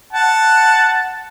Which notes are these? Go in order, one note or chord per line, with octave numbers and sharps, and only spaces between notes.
F#5 A5